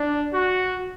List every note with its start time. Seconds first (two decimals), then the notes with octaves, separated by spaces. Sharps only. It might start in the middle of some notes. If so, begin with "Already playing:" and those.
Already playing: D4
0.32 F#4